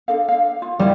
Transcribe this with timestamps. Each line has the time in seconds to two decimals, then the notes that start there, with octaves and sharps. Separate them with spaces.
0.08 D4 A4 F5
0.29 F5
0.62 F4
0.79 G3 E4 C#5 F5